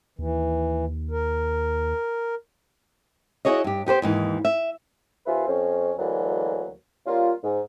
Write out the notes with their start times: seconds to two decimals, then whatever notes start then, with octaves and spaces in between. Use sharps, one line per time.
0.19 D#2 E3
1.11 A#4
3.45 E4 F#4 G#4 C#5 D#5
3.64 G2 G4
3.86 B3 G4 B4 C5
4.02 D#2 G#2 E3
4.45 E5
5.26 D#2 F4 B4 C5 E5 G#5
5.47 F2 C4 C#4
5.98 D2 E3 F#3 G#3 A#3 D4
7.06 G3 A#3 C#4 F4
7.43 G#2